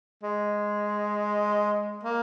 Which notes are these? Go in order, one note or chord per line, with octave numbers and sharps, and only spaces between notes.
G#3
A#3